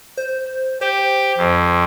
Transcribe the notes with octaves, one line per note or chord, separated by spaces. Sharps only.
C5
G4 C5
F2